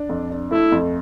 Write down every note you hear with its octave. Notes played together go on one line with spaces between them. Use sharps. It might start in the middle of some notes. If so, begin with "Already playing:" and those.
Already playing: D4
F2
D4
A3 E4
F2